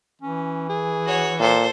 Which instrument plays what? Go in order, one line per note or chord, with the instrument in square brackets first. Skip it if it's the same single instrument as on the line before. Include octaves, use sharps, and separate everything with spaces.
[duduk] E3 [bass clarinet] C#4
[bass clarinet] G#4
[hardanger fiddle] F#4 C#5
[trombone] A#2 [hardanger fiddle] A4 C5